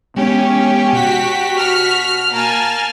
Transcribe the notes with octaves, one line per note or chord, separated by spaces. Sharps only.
G#3 B3 C#4 D4 G4
B2 F#4 B6
F6
A#3 G#5 A5 F6